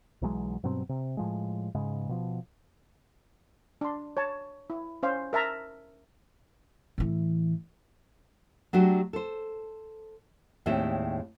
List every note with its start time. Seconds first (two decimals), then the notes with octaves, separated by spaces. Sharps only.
0.22 B1 E3 F#3 G#3
0.63 G2 B2 F#3 C4
0.89 C3
1.17 A2 F3 G#3
1.75 G#2 C#3 G#3
2.09 B2 F3
3.81 D4 C6
4.17 C#5 A5
4.70 E4
5.03 C#4 C5 F5
5.33 A#4 E5 A5 A#5
6.98 A2 E3
8.73 F#3 A3 D4 F#4 G4
9.13 A4 C5
10.66 D#2 A2 G#3 C4 D5 E5